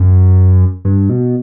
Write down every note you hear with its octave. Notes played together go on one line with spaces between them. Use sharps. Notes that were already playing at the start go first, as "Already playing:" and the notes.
Already playing: F#2
G2
B2